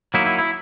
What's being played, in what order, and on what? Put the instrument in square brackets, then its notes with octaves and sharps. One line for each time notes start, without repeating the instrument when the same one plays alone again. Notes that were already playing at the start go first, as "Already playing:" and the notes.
[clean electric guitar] F#3 A#3 D#4 E4
E4
E4